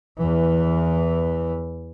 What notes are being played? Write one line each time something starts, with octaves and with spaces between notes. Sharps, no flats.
E2 E3